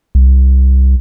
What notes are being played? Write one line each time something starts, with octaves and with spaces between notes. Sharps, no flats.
C2